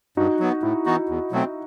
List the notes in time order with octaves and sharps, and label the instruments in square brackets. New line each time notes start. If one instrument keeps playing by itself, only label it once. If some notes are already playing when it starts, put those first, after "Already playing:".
[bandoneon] G2 [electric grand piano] D#4 F#4
[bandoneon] F#3 B3
[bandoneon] A2 [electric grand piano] E4
[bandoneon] E3 B3 D#4 F#4
E2
B2 F#3 A3 C4